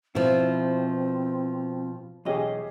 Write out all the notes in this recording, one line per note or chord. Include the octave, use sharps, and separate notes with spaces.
B2 F3 C4 E4
B1 E2 C#4 G4 G#4 D#5